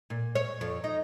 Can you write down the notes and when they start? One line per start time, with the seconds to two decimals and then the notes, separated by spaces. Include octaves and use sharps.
0.10 A#2
0.35 C#5
0.61 F2
0.84 D#4